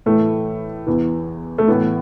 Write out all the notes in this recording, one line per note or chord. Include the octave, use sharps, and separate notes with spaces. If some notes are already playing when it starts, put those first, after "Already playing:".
A2 E3 A3
E2 E3
A3
A2 E3 B3